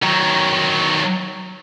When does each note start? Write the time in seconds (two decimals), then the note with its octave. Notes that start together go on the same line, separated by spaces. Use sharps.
0.02 D#3 F#3